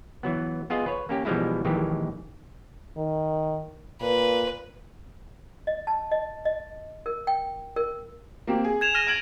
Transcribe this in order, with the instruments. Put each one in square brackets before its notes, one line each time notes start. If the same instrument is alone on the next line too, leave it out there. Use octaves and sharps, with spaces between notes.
[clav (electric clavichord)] E3 F#3 B3
B3 F4 G#4 D#5
B4 C#5
A#3 C#4 G4
B2 E3 F3 G3 G#3 E4
A#1 D#3 E3 G#3 G4
[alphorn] D#3
[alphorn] A#2 [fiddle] B4
[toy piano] D#5
A5
D#5
D#5
A#4
G5
A#4
[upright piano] A#3 C4 G4
G#4
[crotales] G#6 E7 F7
F6 A#6 D#7
[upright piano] G#6 D7 F#7